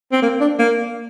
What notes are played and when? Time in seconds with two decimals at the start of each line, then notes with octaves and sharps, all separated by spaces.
0.12 C4
0.23 A#3
0.41 D4
0.59 A#3